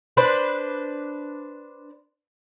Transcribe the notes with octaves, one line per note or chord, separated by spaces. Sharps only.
D4 B4 C5